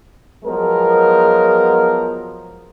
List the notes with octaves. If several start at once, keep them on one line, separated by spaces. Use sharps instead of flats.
F3 F#3 G#3 B3 A#4